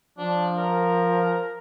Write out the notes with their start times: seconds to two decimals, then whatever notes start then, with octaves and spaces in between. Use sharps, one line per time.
0.18 F3 D4
0.57 A#4